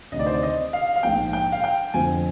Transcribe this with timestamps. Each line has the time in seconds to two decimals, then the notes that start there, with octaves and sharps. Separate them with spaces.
0.12 D2 C3 D#3 D#5
0.19 D5
0.26 C5
0.34 D5
0.43 D#5
0.73 F5
0.96 F5
1.03 A#1 G#2 F3 G5
1.33 G5
1.52 F5
1.64 G5
1.94 F2 D3 F3 C4 F4 G#5